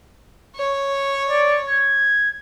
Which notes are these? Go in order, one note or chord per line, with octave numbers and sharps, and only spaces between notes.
C#5
D5
G#6